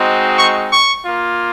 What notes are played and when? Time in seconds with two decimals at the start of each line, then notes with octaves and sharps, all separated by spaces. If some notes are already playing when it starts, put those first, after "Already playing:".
Already playing: G#3 C4 D#4 F#4
0.38 C#6
0.72 C#6
1.05 A#3 F4